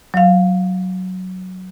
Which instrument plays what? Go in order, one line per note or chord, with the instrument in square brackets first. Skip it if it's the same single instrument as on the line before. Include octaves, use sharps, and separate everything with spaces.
[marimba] F#3 F5